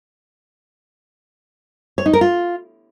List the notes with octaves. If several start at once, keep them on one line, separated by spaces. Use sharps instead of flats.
C#5
D#4
A#4
F4